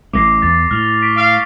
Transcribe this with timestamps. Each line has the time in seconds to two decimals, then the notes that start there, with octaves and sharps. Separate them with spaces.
0.13 A1 A3 D6 A#6 C7
0.42 E2 D6 A6
0.71 A2 F6 F7 G7
1.02 C#6 B6 D7
1.17 F5 D7 G7